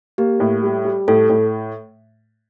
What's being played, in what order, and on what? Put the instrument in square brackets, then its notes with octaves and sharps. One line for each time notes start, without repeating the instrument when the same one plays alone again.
[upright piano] A#3 [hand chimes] G4
[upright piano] A2
G3
G3
[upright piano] A2 [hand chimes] A4
[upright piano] A2